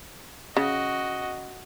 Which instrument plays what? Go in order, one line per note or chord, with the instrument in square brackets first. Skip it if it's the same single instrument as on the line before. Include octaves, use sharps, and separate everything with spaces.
[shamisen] C#3 [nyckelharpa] F#4 D#5